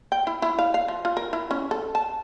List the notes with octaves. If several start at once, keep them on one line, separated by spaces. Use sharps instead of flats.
G5
E4
E4
F5
F5
F3
F4
A#4
E4
C#4
A4
A5